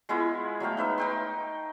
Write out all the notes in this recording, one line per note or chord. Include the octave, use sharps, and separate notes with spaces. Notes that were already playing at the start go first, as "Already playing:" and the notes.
G#3 B3 E4 F4
F#3 A3 F5 G5
D#4 B4 E5
D#4 G5 C6